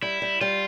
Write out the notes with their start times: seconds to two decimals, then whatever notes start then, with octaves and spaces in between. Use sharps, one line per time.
0.02 G3 E4
0.22 G3
0.41 G3 F4